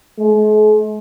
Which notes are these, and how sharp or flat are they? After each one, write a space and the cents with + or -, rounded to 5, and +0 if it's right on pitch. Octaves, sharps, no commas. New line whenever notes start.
G#3 +45